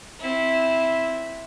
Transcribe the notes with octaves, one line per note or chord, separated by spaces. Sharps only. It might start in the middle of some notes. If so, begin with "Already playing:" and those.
C4 E4